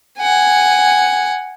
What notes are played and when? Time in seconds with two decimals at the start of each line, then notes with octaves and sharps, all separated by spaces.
0.19 F#5 G#5